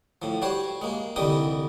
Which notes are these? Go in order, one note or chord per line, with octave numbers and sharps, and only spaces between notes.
A2 F3
G3 F#4 C5 C#5
G#3 A#3
C2 D3 E3 G3 D#4 D#6